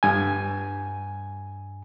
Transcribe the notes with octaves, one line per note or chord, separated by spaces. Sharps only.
G2 G#5